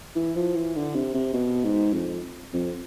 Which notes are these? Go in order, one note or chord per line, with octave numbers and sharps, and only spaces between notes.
E3
F3
E3
D3
C3
C3
B2
G#2
F2
F2